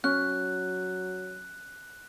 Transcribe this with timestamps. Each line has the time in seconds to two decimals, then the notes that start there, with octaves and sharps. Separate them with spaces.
0.04 F#3 C#4 F#6